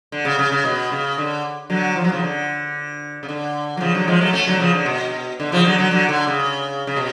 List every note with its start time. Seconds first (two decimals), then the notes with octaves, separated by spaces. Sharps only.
0.12 D3
0.25 C#3
0.39 C#3
0.52 C#3
0.65 B2
0.92 C#3
1.18 D3
1.70 D3 F#3
1.96 F3
2.04 F#3
2.12 C#3 F3
2.23 D3
3.23 C#3
3.28 D3
3.77 F#3
3.80 C#3 F3
3.94 D3 F#3
4.08 F3 G#3
4.21 F#3 A3
4.33 A3 C#4
4.47 D3 F#3
4.59 C#3 F3
4.74 D3
4.86 B2
5.40 D3
5.52 C#3 F3
5.65 D3 F#3
5.78 D3 F#3
5.91 D3 F#3
6.09 D3
6.27 C#3
6.87 C#3
6.96 B2